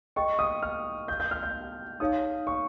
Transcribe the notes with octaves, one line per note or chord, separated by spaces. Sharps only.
G#4 D#5 G5 C#6
D#6
F6
G6
G6
F6
G6
D#4 G#4 C#5 F5 D#6
C#6